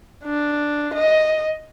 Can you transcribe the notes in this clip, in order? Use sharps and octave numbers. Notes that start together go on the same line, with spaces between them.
D4
D#5